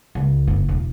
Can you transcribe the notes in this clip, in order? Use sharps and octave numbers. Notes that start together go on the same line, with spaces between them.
C#2
F#1
E1